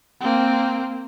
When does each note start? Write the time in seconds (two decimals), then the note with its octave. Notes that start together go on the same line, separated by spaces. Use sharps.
0.20 A#3 C4